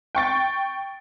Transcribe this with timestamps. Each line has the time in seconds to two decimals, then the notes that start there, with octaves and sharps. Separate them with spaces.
0.15 G5 C#6 A6